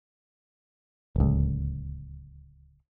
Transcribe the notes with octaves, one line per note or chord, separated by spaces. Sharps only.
D1 C#2